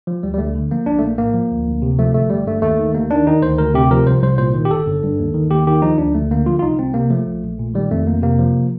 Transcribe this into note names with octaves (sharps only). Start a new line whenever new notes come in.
F3
D2 G3
G3
D2 A3
D3
F3 A#3
A#1 D4
A3
A#1 A#3
A2 A#3
F3
D2
D2
C3
F3 A3
G1 A3
G1 G3
G2 A3
D#2 A3
D#3
D#2 A#3
D#3 D4
D#3 D#4
D2 C5
D2 A#4
C3 G4
F3 A#4
C2 C5
C2 C5
A#2 C5
D#3
G4
G1 A4
G1
G2
D#2
D#3
D#2 G4
D#3 G4
F3 D#4
D2 D4
D2 A3
D3 A#3
F3 F4
F4
C2 D#4
C2 C4
C3 A#3
F3 A3
A#1
A#1
A#2
D#3 G3
F2 A3
F2 A#3
C3 A#3
F3